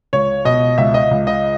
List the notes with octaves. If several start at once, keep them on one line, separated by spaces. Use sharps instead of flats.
C#2 C#5
B2 D#5
C#2 E5
D#5
C#2
D#5